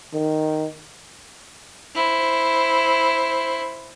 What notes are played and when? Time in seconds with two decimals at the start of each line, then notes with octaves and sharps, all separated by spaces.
0.13 D#3
1.95 E4 C5